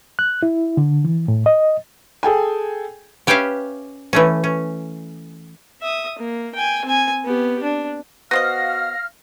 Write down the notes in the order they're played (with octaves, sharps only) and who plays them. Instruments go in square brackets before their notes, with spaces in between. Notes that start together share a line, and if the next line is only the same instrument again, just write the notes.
[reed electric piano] F#6
E4
D3
E3
A2
D#5
[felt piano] G#4 A4 G5 G#5
[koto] C#4 G4 B4 C#5 E5 F5
E3 A3 C#4
C#4
[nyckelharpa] E5 D#6
A#3
G5 G#5
C4 G#5
B3 G4
D4
[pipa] B3 C5 D#5 [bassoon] F#4 [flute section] F5 F6 [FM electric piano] A#6